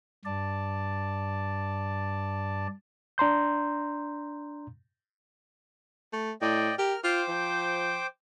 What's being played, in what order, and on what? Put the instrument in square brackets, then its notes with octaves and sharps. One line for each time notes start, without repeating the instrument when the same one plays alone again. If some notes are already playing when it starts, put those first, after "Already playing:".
[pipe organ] G2 D5 A5
[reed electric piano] D4 A#5 C6 G6
[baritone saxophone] A3
[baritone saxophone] A2 [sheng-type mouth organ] D5 D#5 G5
[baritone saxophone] G4 [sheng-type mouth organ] A#4 F6
[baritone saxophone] F4 [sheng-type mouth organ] C5 G5 D6
[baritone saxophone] F3